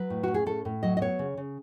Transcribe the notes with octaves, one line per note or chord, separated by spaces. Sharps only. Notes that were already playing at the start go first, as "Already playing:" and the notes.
Already playing: F#3 B4
A2
C#4 F#4
G#4
A2 A4
A2
F#3 D#5
D#5
B3 C#5
C#3
C#3